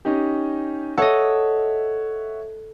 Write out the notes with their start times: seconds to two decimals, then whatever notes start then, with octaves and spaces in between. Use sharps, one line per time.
0.05 C#4 D#4 G4
0.97 A4 C#5 D#5 E5 F#5